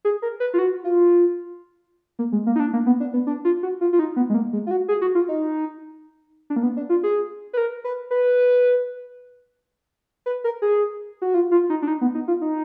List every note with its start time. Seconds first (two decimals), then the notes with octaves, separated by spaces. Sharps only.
0.05 G#4
0.22 A#4
0.40 B4
0.54 F4
0.59 F#4
0.84 F4
2.19 A#3
2.32 G#3
2.46 A#3
2.56 D#4
2.60 D4
2.73 A#3
2.86 B3
3.00 D4
3.13 B3
3.27 D4
3.45 F4
3.63 F#4
3.81 F4
3.93 F4
3.99 D#4
4.16 B3
4.30 G#3
4.34 A#3
4.53 G#3
4.67 F4
4.71 F#4
4.88 G#4
5.02 F#4
5.15 F4
5.28 D#4
6.50 D4
6.56 A#3
6.63 B3
6.77 D4
6.89 F4
7.03 G#4
7.53 B4
7.57 A#4
7.84 B4
8.11 B4
10.26 B4
10.44 A#4
10.62 G#4
11.22 F#4
11.34 F4
11.51 F4
11.70 D#4
11.82 D4
11.88 D#4
12.01 B3
12.15 D#4
12.28 F4
12.42 D#4